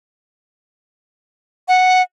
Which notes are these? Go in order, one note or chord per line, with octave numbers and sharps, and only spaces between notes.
F#5